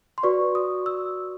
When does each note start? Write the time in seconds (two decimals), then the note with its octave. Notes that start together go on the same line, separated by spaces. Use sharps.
0.18 C6
0.23 F#4 B4 D5 C#6
0.55 D#6
0.86 E6